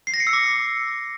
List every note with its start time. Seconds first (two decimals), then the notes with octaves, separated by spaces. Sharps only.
0.07 C7
0.14 A#6
0.20 C#7
0.27 E6
0.33 D6